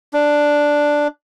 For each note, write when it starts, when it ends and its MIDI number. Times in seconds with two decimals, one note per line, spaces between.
0.13 1.08 62